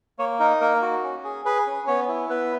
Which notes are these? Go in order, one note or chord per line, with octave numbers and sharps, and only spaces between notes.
A#3 C#5
D#4 A#4
A#3 A#4
F#4
C#4
G#4
G#4 B4
C#4
B3 C#5
E4
B3 B4